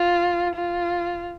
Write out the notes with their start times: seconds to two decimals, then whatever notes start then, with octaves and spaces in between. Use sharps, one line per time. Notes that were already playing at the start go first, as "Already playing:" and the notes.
Already playing: F4
0.55 F4